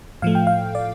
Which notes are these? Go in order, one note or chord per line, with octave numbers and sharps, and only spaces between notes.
A2 F3 A3 F5
G5
F5
D5